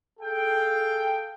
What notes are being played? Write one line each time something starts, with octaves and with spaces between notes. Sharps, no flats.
G#4 A4 F5 G5